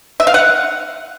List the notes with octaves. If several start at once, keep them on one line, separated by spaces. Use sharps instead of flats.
E5
F5
F#5